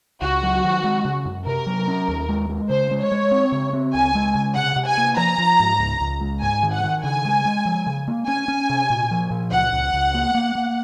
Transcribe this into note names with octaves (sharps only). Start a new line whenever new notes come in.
C#2 F#4
F#3
D#3
G#3
C#3
F#2
C3 A#4
F#3
C#4
D#2
G#3
G#3
C#3 C5
G#3
C#5
G#3
C4
C#3
C4
C#2 G#5
G#3
C#3
C3 F#5
C3
G#5
A#3
F3 A#5
F3
G#2
C#2
C#2
G#3
G#2 G#5
D#3
F#5
D#3
C#3 G#5
G#3
G#3
F3
C#3
A#3
C#4 G#5
C#4
C3
A#2
F3
A#2
C#2 F#5
C#2
C#2
A#3
A#3
A#3